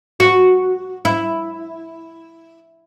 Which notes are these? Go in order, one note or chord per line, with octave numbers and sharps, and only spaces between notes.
F#4
E4